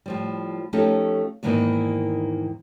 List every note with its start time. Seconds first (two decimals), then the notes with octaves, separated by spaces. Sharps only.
0.06 A2 F3 G3
0.73 F3 A3 C#4 D#4 G4 A4
1.43 E2 G#2 D#3 E3 A#3 D#4